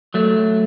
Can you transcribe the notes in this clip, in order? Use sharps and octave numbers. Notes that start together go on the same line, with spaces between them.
F#3 A3